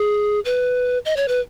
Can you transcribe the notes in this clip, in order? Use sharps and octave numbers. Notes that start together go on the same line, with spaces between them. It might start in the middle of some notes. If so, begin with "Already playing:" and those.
Already playing: G#4
B4
D#5
C#5
B4